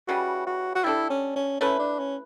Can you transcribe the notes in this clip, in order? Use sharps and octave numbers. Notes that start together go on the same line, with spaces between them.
C#3 E3 G3 F#4
F#4
F#4
G3 D4 E4 A4
C#4
C#4
A3 C#4 E4 B4
D4
C#4